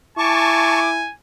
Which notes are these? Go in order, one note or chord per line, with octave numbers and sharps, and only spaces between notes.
E4 G#5 A5 C#6 D6